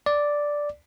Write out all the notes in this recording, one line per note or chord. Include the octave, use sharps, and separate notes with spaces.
D5